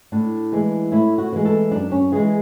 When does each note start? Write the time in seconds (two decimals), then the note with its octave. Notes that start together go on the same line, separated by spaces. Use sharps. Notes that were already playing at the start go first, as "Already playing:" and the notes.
0.12 A2 D4
0.52 E3 G#3
0.92 A2 E4
1.18 F#4
1.33 E3 G#3
1.45 A4
1.72 F#2 D4
1.92 C#4
2.12 E3 G#3 G#4